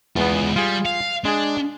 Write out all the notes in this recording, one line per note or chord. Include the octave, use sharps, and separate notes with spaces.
E2 G#3 B3 F4
G3 F4 G#4
F5
G#3 D4 G#4